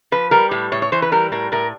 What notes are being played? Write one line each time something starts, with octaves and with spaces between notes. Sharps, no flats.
F3 B4
G3 A#4
A2 G4
A2 C#5
C#5
E3 C5
B4
G3 A#4
A2 A#4
A2 A#4